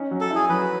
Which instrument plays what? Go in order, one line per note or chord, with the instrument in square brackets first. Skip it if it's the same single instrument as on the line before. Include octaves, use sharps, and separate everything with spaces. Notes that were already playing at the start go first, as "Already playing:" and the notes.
Already playing: [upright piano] C#4 D#4
F#3
[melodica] A4
[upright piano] E4 [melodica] G#4
[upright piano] F#3 [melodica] B4